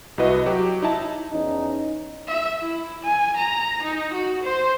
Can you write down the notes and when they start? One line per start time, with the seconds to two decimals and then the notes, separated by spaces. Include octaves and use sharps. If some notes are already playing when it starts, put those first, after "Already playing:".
0.18 C2 E4 F#4 B4 D#5
0.46 F#3 G4
0.83 D#4 E4 A5
1.31 E2 C#4 D#4
2.27 E5
2.62 E4
3.03 G#5
3.37 A#5
3.83 D#4
4.13 F#4
4.43 C5